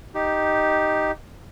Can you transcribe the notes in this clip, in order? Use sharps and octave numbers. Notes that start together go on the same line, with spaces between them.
D#4 G4